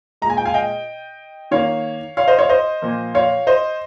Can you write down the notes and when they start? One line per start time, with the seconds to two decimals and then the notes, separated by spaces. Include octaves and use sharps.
0.22 A#2 G#3 A#5
0.30 G#5
0.37 G5
0.45 F5 G#5
0.54 D#5 G5
1.51 D#3 A#3 C#5 F5
2.17 C#5 F5
2.28 C5 D#5
2.39 C#5 F5
2.49 C5 D#5
2.82 A#2 F3 A#3
3.15 C#5 F5
3.47 C5 D#5